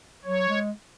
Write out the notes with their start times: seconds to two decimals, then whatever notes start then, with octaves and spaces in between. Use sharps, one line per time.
0.25 F#3 C#5
0.49 G#3